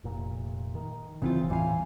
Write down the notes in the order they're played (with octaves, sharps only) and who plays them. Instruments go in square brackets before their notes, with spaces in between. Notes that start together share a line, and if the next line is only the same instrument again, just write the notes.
[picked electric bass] F1 A#2
D#3
[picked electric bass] F#1 [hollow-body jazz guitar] C#3 E3 F4 [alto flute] C4
[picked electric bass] D#2 A2 G3 [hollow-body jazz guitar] E3 F5 [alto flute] G#5